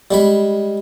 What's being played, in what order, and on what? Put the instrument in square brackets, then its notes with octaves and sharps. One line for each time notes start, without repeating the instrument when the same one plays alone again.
[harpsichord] G3 G#3 B5